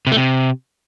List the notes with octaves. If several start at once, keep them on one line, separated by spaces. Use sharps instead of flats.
C3
A3
C3